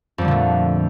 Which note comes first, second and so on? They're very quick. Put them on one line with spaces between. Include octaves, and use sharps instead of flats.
F2 G3 D3 A#2 A3